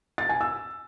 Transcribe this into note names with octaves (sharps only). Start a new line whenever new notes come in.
A6
G#5
E6